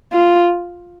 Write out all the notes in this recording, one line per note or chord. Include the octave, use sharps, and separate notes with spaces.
F4